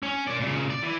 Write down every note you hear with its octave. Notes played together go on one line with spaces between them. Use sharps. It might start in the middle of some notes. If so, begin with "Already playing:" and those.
C#4
A#4 D5
A#2 C#3
D5
E3